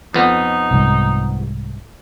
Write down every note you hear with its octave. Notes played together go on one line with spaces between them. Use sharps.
F2 B3 D#4
C2 G#2